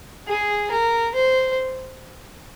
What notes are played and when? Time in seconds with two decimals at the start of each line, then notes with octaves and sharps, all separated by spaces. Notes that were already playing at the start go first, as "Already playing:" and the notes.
0.28 G#4
0.72 A#4
1.15 C5